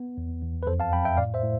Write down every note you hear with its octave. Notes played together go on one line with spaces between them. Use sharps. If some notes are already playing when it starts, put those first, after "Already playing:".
Already playing: B3
E2
E2
B4
F2 A4 C5
F5 A5
F2 G5 B5
E5 G5
A2 D5 F5
C5 E5
A2